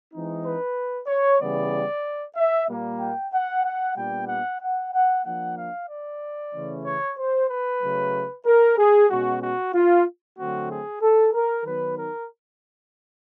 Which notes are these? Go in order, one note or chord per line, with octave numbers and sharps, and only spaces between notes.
E3 G#3 C4 D#4
B4
C#5
C#3 E3 G3 B3 D5
E5
A#2 G3 A#3
G5
F#5
F#5
A#2 G3 B3 D4 G5
F#5
F#5
F#5
F3 A#3 D4 F#5
F5
D5
C#3 E3 A3 C#4
C#5
C5
B4
C#3 F#3 A3
A#4
G#4
B2 G#3 C#4 F#4
F#4
F4
D3 F#3 A3 C4 F#4
G#4
A4
A#4
D#3 F#3 B3 D#4 B4
A#4